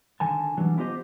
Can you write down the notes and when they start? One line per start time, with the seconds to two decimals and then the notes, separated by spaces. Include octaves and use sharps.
0.20 D3 D#3 G#5 A5
0.57 E3 F#3 G3 D4
0.77 B3 E4 F4 G4 C5 D#5